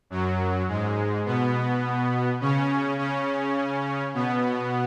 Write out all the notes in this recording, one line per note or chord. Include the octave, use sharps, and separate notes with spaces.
F#2 F#3
G#2 G#3
B2 B3
C#3 C#4
C#3 C#4
B2 B3